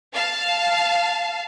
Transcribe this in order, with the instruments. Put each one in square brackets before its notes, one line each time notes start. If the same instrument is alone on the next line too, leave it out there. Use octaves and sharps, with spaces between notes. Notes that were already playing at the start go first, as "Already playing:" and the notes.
[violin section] F5 A5